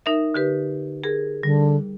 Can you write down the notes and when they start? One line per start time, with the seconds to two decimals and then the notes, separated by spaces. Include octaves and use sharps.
0.06 D#4 A#4 E5
0.34 D3 G4 B4
1.04 G#4 A#4
1.43 D3 G3